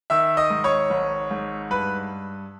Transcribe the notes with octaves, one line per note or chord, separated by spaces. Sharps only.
D#3 E5 E6
D#5 D#6
G#2
C#5 C#6
G#1
G#2
G2 B4 B5